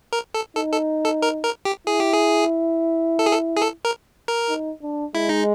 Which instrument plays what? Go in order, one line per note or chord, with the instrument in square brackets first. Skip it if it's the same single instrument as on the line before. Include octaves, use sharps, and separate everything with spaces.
[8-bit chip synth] A#4
A4
[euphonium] D#4 [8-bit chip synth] A4
[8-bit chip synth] A4
A4
A#4
A#4
G4
[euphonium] E4 [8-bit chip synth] G#4
[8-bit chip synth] G4
G#4
A4
G#4
A4
G#4
A4
A#4
A#4
[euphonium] D#4
D4
[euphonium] G#3 [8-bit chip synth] E4
[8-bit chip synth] D#4